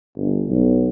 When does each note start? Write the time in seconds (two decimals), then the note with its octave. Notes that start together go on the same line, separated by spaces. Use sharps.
0.16 G1
0.49 B1